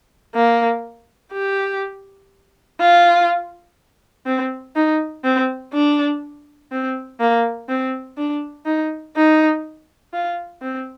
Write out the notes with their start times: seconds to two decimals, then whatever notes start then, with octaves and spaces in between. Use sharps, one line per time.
0.35 A#3
1.33 G4
2.80 F4
4.26 C4
4.76 D#4
5.24 C4
5.73 D4
6.72 C4
7.20 A#3
7.69 C4
8.18 D4
8.66 D#4
9.16 D#4
10.13 F4
10.62 C4